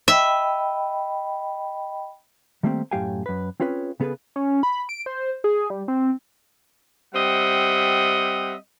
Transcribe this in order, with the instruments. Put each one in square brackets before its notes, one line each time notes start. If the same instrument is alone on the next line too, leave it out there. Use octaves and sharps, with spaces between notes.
[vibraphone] D#5 G5 B5 [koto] E5
[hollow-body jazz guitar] D#3 G3 A3 A#3 C4 G4
F#2 A2 G4 F5 G5 G#5
F#2 B4
C4 C#4 F4 G#4 B4 C#5
C#3 B3 G#4 A4 B4
[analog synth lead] C#4
B5
D7
C5
G#4
G3
C4
[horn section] G3 C4 D#5 E5 F#5